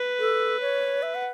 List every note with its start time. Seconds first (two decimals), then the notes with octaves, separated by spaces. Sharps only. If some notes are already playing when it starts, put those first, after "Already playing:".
Already playing: B4
0.19 A4
0.61 C#5
1.03 E5
1.15 F#5